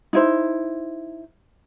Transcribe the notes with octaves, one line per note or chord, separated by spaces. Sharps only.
D#4 E4 C5